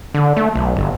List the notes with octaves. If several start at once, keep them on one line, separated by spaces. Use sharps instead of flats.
D3
A3
B1
G1